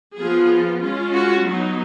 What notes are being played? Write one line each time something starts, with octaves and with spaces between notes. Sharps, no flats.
F3 B3 F4 G#4
G#3 C#4 F4
F#4
F#3 B3 D#4